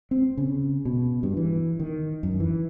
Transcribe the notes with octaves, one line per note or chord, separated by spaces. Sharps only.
C4
C#3
B2
G2
E3
D#3
F#2
E3